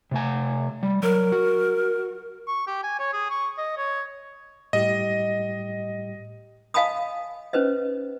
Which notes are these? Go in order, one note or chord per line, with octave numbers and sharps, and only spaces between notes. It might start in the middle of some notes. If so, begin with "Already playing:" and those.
C3 A3 G#5
G3
F#3 A#4
F#4
C#6
G4
G#5
C#5
G#4
C#6
D#5
C#5
A2 G3 G4 D#5
D#5 F5 G#5 A5 B5 D#6
C#4 D#4 B4 C5 D#5